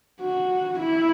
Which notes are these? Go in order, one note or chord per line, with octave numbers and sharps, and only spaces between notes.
F#4
E4